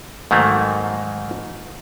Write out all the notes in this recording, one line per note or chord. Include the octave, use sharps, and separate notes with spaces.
G#2 D#3 F#3 A3 A#3